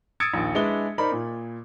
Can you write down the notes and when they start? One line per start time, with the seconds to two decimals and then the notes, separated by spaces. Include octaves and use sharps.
0.20 D#6 E6 G#6 A6 C#7 D7
0.34 A#1 D#2
0.55 G#3 D4 E4 B4 D#6 G7
0.98 D#4 A#4 C5 D5 B5
1.12 A#2